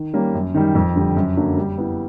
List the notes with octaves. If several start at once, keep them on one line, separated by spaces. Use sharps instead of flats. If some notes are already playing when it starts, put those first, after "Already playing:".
Already playing: D#3
G3 A#3 C#4
F#2
D#3 G3
F2
D3 G3
F#2
D3 F#3 A#3 D4
G3
B3 E4